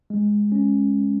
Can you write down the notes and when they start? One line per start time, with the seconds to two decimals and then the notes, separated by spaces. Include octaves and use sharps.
0.10 G#3
0.52 C#4